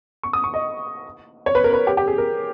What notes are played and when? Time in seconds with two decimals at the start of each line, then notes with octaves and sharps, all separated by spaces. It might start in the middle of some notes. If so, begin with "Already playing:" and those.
0.23 C#6
0.33 D#6
0.44 C#6
0.54 D#5
1.46 C#5
1.55 B4
1.64 A#4
1.73 B4
1.87 G4
1.97 G4
2.08 G#4
2.18 A#4